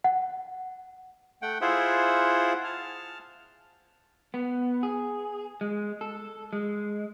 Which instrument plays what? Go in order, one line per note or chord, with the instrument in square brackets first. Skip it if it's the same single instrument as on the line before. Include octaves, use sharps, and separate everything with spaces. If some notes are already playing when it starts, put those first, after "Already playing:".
[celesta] F#5
[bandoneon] A3 F#5 G5
E4 F4 G#4 C5 E5 F#5
A5 F6
[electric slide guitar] B3
G#4
G#3
A4
G#3